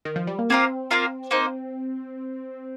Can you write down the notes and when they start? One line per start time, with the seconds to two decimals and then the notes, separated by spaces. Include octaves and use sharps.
0.05 D#3
0.16 F3
0.27 G3
0.39 A#3
0.50 A#3 C4 F4 A#4 F5
0.91 A#3 F4 A#4 F5
1.31 A#3 D#4 C5